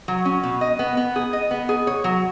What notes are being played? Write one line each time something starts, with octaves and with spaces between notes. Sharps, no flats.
F#3
C#4
B2
D#5
B3
B3
G#4
D#5
B3
G#4
C#5
F#3